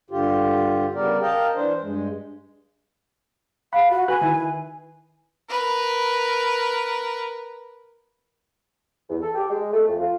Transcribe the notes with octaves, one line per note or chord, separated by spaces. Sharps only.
G2 D3 F4 G4
C#3 G3 B3 A#4 D5
A#4 D#5 F5 G5 A5
E3 D4 C5
G2 G#3
F5 F#5 B5
F#4
F#4 B4 G#5 F#6
D#3 E4 B4
A#4 B4
E2
A4
G4
G#3
A3
F2
F4